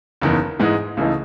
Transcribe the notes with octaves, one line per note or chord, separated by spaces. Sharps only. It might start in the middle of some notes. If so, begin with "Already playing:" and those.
F#1 E2 D#3
G#2 E3 G#3 D#4
C#2 C#3 E3 A3 D#4